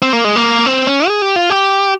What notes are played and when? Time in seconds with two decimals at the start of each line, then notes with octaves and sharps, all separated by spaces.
0.02 C4
0.13 A#3
0.24 G#3
0.36 A#3
0.66 C4
0.87 C#4
1.08 G#4
1.22 G4
1.36 F4
1.50 G4